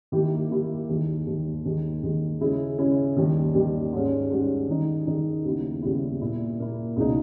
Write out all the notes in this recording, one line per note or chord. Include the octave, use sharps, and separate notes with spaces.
D#3 A#3 E4 G4
D#3 A#3 E4 G4
D#2 D#3 G#3
D#2 D#3 G#3
D#2 D#3 G#3
D#2 D#3 G#3
C#3 G#3 C#4 E4 G#4
C#3 G#3 C#4 E4 G#4
D#2 D#3 G3
D#2 D#3 G3
G#2 G3 C#4 G#4
G#2 G3 C#4 G#4
D#3 G#3 D#4 G#4
D#3 G#3 D#4 G#4
D#2 C#3 G3 B3 E4
D#2 C#3 G3 B3 E4
A#2 A#3 E4
A#2 A#3 E4
C#2 B2 G#3 D#4